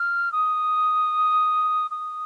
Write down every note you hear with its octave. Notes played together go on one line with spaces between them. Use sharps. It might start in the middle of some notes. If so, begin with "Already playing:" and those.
Already playing: F6
D#6
D#6